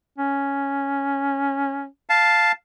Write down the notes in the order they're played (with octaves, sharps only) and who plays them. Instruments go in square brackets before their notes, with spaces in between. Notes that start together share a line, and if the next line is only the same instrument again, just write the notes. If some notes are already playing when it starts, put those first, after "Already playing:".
[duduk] C#4
[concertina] F5 A5